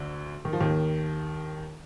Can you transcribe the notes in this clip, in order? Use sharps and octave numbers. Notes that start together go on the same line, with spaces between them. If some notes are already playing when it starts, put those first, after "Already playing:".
Already playing: D2 D3
D#3
F3
D#2 D#3